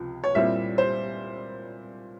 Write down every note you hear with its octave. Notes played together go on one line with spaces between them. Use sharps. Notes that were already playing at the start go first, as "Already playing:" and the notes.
Already playing: C#2 C3 F3
C#5
A#2 G3 C4 E4 E5
C5